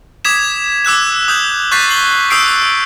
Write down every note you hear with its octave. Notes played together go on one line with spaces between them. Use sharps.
D6 D#6 G#6 B6 E7
D6 E6 F#6 E7
D#6 G6 F#7
C#6 F#6 G6 A6 B6 C7
C7 F#7 G7
D#6 E6 G6 C7 D7